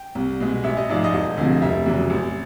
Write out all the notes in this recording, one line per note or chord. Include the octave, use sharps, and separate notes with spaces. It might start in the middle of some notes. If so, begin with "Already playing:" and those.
Already playing: G5
C2
B2 G#3
A1 E5
D#5
G#2 F3 G#3 D5
D#5
E1
D2 C3 F3
F1 E5
E2 C#3 F#3
A1